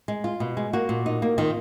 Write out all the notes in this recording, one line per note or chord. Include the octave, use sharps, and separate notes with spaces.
G#3
F4
B2
G#3
A#3 F#4
A#2
D#4
A#3
D#3 F4